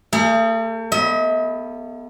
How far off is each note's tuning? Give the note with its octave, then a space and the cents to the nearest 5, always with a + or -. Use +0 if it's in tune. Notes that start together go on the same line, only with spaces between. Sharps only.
A3 +45 G#4 +0
B3 +0 D#5 +40